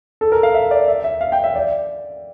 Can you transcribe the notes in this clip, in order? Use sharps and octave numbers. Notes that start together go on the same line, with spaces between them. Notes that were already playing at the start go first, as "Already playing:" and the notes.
A4
A#4
F5
E5
D5
E5
E5
F5
G5
E5
D5